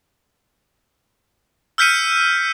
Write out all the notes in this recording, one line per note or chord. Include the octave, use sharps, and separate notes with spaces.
E6 F6 G6 B6 C#7 D#7